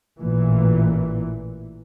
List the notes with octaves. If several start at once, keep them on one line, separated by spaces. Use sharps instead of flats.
A1 A#2 E3